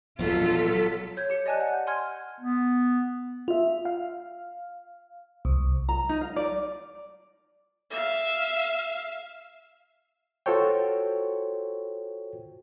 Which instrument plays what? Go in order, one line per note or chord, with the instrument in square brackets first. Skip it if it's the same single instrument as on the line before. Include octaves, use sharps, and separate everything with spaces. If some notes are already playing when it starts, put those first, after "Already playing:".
[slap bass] E1 A#1 E2 [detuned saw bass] F#3 [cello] F4 [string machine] A4 B6
[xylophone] C#5 G6 G#6
G4 C#7
D5 D#5 G#5 A5 F#6
F#5
G6
G#5 C6 F6 G#6
[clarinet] B3
[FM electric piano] F4 E5
F5
C2
[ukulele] A#5
D#4
F5
D5
[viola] E5 F5
[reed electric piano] F4 F#4 A4 C5 C#5 G5